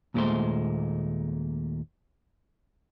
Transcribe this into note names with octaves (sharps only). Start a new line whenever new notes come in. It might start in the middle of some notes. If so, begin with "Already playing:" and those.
D#2 A#2 F3 G#3 A3 C5